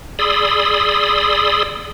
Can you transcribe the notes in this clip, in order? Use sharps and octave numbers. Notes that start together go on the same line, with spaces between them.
G#4 D5 B5 C6 D#6 E6